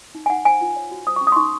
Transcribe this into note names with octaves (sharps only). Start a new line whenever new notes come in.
D#4
G#5
D#4 F#5
C5 G#5
F4
C#5
F#4
C5 D#6
C#4 C#6
D#6
C6
D#4 C#6